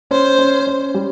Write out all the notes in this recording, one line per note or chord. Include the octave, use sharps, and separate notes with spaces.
C#4 C5
C#4
C#4
G3